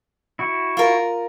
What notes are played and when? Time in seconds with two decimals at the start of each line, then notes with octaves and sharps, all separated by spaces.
0.39 E4 F#4
0.77 F4 A#4